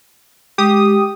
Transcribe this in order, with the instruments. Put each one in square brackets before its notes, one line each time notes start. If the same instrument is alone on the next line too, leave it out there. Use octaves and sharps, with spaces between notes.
[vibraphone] G#3 [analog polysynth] G4 D#6